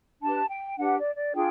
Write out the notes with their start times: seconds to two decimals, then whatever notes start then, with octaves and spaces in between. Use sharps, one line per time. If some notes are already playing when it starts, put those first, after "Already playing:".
0.22 D4 G4 B4 A5
0.50 G5
0.78 D4 G4 B4 F#5
0.97 D5
1.16 D5
1.35 D4 F4 G#4 G5